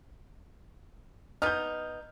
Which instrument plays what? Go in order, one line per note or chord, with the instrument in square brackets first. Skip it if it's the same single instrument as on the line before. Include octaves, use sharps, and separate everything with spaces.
[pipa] B3 D#4 [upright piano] F6 G6